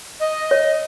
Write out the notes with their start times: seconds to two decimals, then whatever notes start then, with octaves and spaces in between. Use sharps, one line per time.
0.20 D#5
0.51 C#5